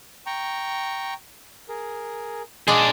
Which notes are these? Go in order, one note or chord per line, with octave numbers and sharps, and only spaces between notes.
G5 A#5 C#6
G#4 A#4
G#3 D4 G#4 D5